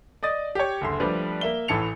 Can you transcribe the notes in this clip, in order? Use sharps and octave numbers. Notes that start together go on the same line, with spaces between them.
D5 D#5 D#6 A6
G4 C#5
F#1 D2 C6
F3 G3 A3 D4 B4 D5
A#3 E5 G7
A1 A2 E3 A5 C#7 F7